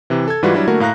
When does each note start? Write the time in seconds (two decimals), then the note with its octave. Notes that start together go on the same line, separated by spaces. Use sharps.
0.10 C3 E3
0.28 A4 G#6
0.43 G#2 E3 G3 F4 F#4 B4
0.54 F#3 G3 D4 E4
0.68 D3 A3 A#3 F#4 A#4
0.80 A2 F5 A#5 F#6 A#6